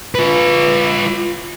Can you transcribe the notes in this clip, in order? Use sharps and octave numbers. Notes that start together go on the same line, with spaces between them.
F4 B4